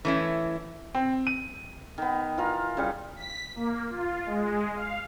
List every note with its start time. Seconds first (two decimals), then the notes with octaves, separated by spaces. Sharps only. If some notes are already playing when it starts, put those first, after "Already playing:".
0.05 E3 A3 C#4 E4
0.95 C4
1.27 D#7
1.98 D#3 B3
2.37 E3 F4 A#4
2.77 C#3 G3
3.16 B6
3.56 A#3
3.89 F4
4.26 G#3
4.75 F5